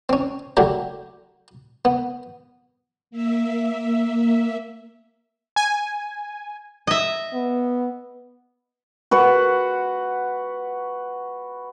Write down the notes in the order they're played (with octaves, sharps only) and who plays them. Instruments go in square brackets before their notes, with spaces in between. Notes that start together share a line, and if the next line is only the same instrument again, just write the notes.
[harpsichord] C4 C#4
D3 F#3 A3 G4 C#5
B3
[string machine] A#3 E5
[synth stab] G#5
[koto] D#5 E5
[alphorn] B3
[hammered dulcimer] F#4 B4 F#5